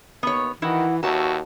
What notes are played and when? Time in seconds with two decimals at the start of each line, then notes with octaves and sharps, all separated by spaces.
0.23 D#2 B3 C#5
0.62 D#3 E3 E4 F#4 D#5 F#5
1.03 D#2 F#4 B4 C#5 E5 A5